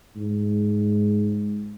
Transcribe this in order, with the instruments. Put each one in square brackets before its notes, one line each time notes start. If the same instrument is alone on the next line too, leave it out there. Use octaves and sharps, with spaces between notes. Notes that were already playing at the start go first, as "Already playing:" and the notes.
[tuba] G#2